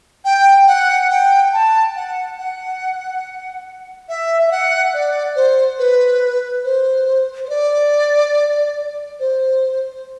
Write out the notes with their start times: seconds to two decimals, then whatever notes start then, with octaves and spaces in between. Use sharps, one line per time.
0.25 G5
0.67 F#5
1.10 G5
1.53 A5
1.96 F#5
2.38 F#5
4.09 E5
4.48 E5
4.51 F#5
4.94 D5
5.36 C5
5.79 B4
6.64 C5
7.45 C5
7.49 D5
9.20 C5